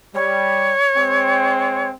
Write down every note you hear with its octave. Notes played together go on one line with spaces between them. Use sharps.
G3 C#5
G#3 C4 G5